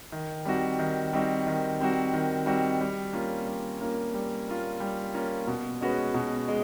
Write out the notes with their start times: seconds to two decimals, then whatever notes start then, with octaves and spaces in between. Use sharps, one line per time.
0.12 D#3
0.45 G3 C4 D#4 F#4
0.79 D#3
1.13 G3 C4 D#4 F#4
1.47 D#3
1.80 G3 C4 D#4 F#4
2.14 D#3
2.46 G3 C4 D#4 F#4
2.81 G3
3.13 A#3 C#4 F4
3.47 G3
3.81 A#3 C#4 F4
4.14 G3
4.48 A#3 C#4 F4
4.80 G3
5.14 A#3 C#4 F4
5.47 B2
5.81 G#3 C#4 F#4 B4
6.14 B2
6.48 G#3